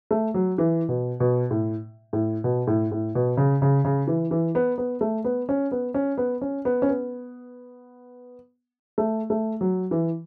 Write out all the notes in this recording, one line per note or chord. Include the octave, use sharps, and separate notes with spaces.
A3
F#3
E3
B2
B2
A2
A2
B2
A2
A2
B2
C#3
C#3
C#3
E3
E3
B3
B3
A3
B3
C#4
B3
C#4
B3
C#4
B3
C#4
B3
A3
A3
F#3
E3